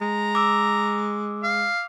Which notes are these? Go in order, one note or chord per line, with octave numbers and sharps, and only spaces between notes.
G#3 A#5
D6 E6
F5